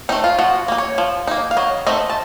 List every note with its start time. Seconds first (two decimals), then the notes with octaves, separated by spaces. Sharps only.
0.09 A3 C4 D#4
0.24 F4
0.38 F3 F#4
0.68 A#3 D#4
0.78 C#5
0.98 F3
1.27 A#3 D#4
1.51 F5
1.57 F#3 D#5
1.87 A3 C4 D#4 D#5
2.10 A5